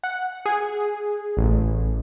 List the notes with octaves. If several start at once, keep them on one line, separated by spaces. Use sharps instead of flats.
F#5
G#4
A1